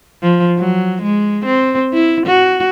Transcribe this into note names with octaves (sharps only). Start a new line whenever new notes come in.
F3
F#3
G#3
C4
E4
F#4